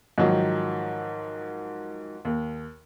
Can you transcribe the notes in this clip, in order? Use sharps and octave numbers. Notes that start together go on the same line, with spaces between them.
G#2 D#3 F3 F#3
D#2